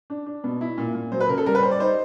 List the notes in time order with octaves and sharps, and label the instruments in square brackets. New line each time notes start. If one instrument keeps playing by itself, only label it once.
[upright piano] D4
D4
B2
E4
A#2
A#2
F#3 C5
B4
C#3 A#4
A4
G3 A#4
B4
G3 C5
D5
D#4 C5